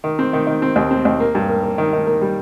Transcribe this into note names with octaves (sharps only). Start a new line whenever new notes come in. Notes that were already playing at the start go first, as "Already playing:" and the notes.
D#3
C4
D#3
D#3
C4
D#2
C4
D#2
A#3
G2
A#3
A#3
D#3
D#3
A#3
G3